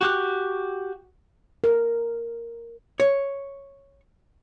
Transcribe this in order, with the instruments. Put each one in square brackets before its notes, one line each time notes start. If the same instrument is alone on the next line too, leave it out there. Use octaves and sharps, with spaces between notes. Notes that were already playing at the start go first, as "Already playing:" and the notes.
[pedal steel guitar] F#4 G4 F#6
[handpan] A#4
[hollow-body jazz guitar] C#5